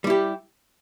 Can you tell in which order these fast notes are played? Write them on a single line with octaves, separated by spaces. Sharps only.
G3 E4 G4